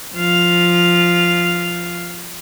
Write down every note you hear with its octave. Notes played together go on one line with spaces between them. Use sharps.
F3 F5